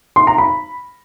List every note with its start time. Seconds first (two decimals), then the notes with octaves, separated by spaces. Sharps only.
0.16 C6
0.27 A#5
0.38 B5